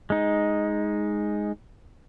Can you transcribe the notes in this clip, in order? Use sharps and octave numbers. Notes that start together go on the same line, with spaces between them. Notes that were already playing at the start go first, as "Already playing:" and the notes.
G#3 D#4